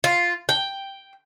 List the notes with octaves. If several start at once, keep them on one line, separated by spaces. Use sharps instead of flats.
F4
G5